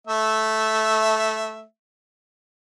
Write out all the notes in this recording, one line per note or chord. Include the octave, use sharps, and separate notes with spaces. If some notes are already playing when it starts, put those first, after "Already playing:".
A3 E5